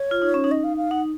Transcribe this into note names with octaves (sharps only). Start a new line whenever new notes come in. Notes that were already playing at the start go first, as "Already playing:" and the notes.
Already playing: C#5
F4
D#4
C#4
D#4
D#5
F5
F5
D#4 F#5